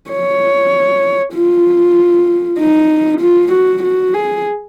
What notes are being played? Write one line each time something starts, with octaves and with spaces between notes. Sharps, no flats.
C#5
F4
D#4
F4
F#4
F#4
G#4